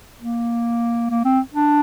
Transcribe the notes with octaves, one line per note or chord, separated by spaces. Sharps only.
A#3
A#3
C4
D4